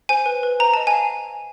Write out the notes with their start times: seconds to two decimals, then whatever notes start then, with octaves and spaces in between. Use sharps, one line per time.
0.09 C5 G#5
0.26 B4
0.43 B4
0.60 C5 A#5
0.74 D#5 A5
0.87 G#5
0.94 F5